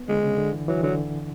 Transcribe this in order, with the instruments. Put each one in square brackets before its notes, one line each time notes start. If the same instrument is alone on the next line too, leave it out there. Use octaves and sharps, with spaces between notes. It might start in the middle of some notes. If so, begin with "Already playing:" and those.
Already playing: [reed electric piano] B3
[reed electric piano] D3 [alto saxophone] G#3
[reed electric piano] C#3
D3
E3
[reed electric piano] E3 [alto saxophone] F#3
[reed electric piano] D3 [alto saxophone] F#3